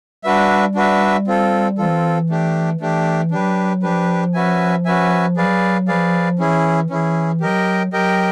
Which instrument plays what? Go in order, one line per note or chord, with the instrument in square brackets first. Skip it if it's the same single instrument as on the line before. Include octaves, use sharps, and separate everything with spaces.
[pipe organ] G3 [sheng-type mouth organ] D4 F#4 B4 E5
[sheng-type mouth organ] D4 F#4 B4 E5
C4 F4 A4
[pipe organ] E3 [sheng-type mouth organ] C4 F4 A4
[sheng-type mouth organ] A3 D4 G4
[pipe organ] E3 [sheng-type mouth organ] A3 D4 G4
[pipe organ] F#3 [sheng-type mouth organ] D4 G4 B4
[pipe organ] F3 [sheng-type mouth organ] D4 G4 B4
[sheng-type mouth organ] C#4 F#4 B4 E5 G#5
C#4 F#4 B4 E5 G#5
[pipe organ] F#3 [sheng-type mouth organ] G#4 B4 D5 F5
[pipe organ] F3 [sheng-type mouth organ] G#4 B4 D5 F5
[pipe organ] E3 [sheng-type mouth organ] C#4 E4 G#4
[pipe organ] E3 [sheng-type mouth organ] C#4 E4 G#4
[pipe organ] F#3 [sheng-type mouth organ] G4 A#4 D#5 G5
[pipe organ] F#3 [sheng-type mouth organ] G4 A#4 D#5 G5